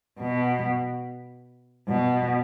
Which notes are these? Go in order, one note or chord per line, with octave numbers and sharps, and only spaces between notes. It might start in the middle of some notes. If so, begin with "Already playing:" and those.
B2
B2